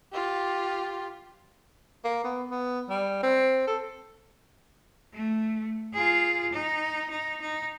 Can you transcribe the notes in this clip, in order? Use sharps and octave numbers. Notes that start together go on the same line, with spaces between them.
F4 G4
A#3
B3
B3
G3
C4
A4
A3
F4 G#4
D#4
D#4
D#4